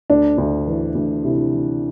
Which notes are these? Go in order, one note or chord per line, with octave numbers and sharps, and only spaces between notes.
D2 D4
D2
E3
D2
C3 E4
E3